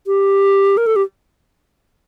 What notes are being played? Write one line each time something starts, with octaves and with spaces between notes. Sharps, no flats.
G4
A#4
A4
G4